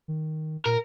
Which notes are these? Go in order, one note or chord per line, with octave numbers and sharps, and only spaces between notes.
D#3
A#2 A#4